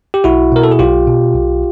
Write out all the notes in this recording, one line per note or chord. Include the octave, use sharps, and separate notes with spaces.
G4
B1 E4 F#4
B2 A#4
A4
G#4
B1 F4 G4
B2
B1